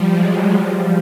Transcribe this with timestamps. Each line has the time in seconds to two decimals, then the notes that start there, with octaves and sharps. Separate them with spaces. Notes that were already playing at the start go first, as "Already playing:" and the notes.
Already playing: F3 G3
0.09 F#3 G#3
0.50 F3 G3